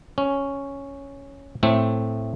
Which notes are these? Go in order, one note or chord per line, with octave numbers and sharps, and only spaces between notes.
C#4
A2 A3 C4